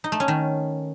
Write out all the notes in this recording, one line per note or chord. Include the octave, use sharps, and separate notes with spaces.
D#4
A3
C#4
D#3